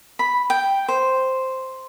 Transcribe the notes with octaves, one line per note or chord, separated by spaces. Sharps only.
B5
G5
C5